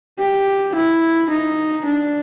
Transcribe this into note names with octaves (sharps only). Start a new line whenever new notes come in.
G4
E4
D#4
D4